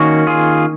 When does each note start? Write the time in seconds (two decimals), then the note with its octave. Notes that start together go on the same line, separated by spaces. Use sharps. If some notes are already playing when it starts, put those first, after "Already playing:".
Already playing: D#3 A#3 C#4 F#4
0.27 F4 G#4